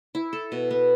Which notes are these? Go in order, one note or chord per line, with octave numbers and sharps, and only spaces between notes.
E4
A4
B2
B3